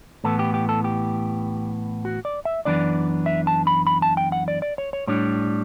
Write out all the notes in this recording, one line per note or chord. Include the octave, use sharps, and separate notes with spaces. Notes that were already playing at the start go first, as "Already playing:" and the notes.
A2 E3 B3 A4
G4
G4
A4
G4
F#4
D5
E5
F#2 E3 B3 D4 D5
E5
A5
B5
B5
A5
G5
F#5
D5
D5
C#5
C#5
A2 G3 D4 C#5